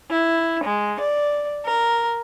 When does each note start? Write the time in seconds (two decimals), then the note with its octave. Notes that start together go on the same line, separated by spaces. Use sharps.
0.10 E4
0.64 G#3
1.00 D5
1.64 A#4